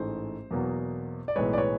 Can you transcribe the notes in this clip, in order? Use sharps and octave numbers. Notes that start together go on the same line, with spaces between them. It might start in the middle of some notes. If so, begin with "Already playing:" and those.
Already playing: A1 G#2 E3 A3 C5
E2 B2 F#3 A#3
D5
B1 A2 E3 G#3 B4 C#5
D5
B4 C#5